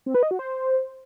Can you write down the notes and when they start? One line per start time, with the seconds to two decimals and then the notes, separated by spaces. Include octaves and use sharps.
0.06 C4
0.15 B4
0.23 D#5
0.31 F#4
0.39 C5